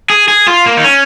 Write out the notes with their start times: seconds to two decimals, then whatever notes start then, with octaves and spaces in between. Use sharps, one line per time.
0.10 G#4
0.28 G#4
0.47 F4
0.66 A#3
0.77 D#4
0.84 C#4